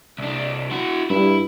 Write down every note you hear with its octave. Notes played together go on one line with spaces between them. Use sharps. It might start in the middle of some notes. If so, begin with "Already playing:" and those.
C2 D4
E4 F#4
G2 E4